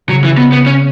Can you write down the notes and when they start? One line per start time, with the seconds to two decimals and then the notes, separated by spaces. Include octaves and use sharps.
0.09 C#3 F#3
0.24 E3
0.38 B3
0.52 B3
0.66 C#4